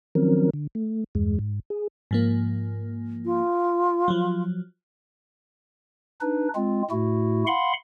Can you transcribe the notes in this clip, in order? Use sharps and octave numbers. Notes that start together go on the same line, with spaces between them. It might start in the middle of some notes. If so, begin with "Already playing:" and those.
D#3 F3 F#3 C4 C#4 A#4
D3
A3
E2 G2 G#3
G#2
G#4
G#2 F3 A#3
F4
F3 F#3
D4 D#4 B4
G#3 C4 F4
A2 A3 E4 F#4
F5 F#5 B5 C6